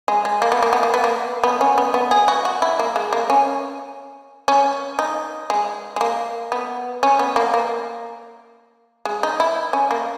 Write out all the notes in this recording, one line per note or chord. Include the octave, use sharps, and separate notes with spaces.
G#3
G#3
A#3
B3
A#3
B3
A#3
B3
A#3
B3
C#4
B3
B3
G#4
F#4
F#4
E4
A#3
G#3
A#3
C#4
C#4
D#4
G#3
G#3
A#3
B3
C#4
B3
A#3
A#3
G#3
D#4
E4
C#4
A#3